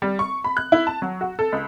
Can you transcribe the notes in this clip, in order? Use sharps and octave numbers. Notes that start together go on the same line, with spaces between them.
G3
C#6
B5
F#6
E4
A5
F#3
F#4
A4
C#2